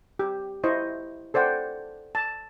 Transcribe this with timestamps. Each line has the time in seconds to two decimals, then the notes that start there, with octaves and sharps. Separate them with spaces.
0.19 G4
0.64 E4 C5 D#5 C#6
1.34 A4 C5 D5 F#5 G5
2.15 A5